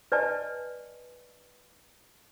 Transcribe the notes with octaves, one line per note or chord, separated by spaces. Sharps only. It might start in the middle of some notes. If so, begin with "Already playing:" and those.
B4 D5 D#5 G#5 A5